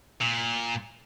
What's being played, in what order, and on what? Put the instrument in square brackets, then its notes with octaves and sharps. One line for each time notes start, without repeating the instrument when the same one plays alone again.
[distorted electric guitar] A#2